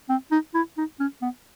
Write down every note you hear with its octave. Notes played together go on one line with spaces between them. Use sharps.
C4
D#4
E4
D#4
C#4
B3